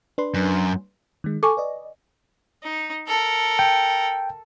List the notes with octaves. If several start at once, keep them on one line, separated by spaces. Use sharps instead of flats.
D4 B4 C6
F#2
D#3 G#3
A4 G#5 C#6 D6
B4 D5 D#5
D#4
A4 A#4
G5